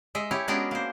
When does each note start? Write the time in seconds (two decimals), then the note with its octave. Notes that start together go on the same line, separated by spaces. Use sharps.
0.15 G#3 D#5 E5
0.31 E4 G4 C#5
0.48 G#3 B3 C#4 D4 F#4 A#4
0.71 A#3 C5